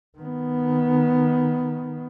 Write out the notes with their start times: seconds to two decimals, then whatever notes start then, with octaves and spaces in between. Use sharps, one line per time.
0.18 D#3 B3